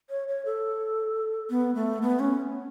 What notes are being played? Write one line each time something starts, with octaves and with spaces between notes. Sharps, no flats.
C#5
C#5
A4
B3
A3
B3
C#4